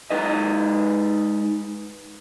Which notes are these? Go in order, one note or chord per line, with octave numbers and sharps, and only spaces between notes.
G#3 D#4 B4 D#5